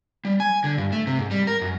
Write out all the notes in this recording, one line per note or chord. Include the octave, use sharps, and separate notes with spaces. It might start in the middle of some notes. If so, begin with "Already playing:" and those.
G3
G#5
D3
G2
A3
C3
G#2
G3
A#4
F#2